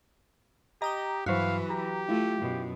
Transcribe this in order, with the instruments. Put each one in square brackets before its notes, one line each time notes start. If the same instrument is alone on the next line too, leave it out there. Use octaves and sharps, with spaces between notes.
[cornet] G4 [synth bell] D#5 D#6 G7 [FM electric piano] A#5
[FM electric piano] G2 C5 [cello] E3 B4 [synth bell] F#3 F#4 [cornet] F5
[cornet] G4 [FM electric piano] A#5
[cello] A3 [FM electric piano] E4 F4
[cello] F#2 B2